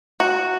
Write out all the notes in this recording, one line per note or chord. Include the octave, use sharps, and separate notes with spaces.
F#4